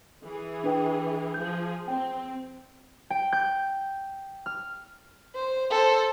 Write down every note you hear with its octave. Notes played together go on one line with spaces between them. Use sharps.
E3 G#4
D4 B4 G5
F3 G#4 G6
C4 G5
G5
G6
F6
C5
A4 C5